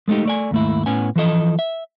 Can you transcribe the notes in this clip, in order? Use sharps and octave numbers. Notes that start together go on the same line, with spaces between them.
G#3 A3 D4 D#4 G4
A3 D5 G#5
D#2 G#2 A3 E4
A2 B3 C#4 G#5
E3 F3 A4 D#5
E5